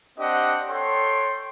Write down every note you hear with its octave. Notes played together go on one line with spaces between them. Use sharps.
C4 D4 G4 D#5 F#5
A4 C#5 G5 C6